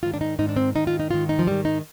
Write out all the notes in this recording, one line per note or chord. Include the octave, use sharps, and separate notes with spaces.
G#2 D#3 F4
D4
D#4
G#2 D#3 D#4
D4
C4
G#2 D#3 D#4
F4
D#4
G#2 D#3 F4
D#4
F3
G#2 D#3 G3
D#4